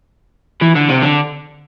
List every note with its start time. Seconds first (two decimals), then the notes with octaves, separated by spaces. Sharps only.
0.62 E3
0.76 D3
0.89 C3
1.03 D3